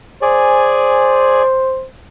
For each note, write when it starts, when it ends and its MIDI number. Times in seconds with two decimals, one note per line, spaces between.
0.22 1.42 68
0.22 1.86 72
0.22 1.42 74
0.22 1.42 80